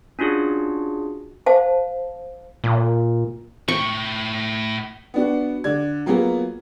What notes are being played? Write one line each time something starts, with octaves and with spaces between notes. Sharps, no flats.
C#4 D4 F4 F#4 G#4
C5 F5 A5
A#2
A2 G5 C#6
B3 D4 F#4
D3 D5 G#6
F#3 A#3 B3 F4 G#4